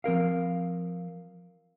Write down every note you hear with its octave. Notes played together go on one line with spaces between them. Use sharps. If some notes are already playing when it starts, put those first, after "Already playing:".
F3 C4 A#4 F5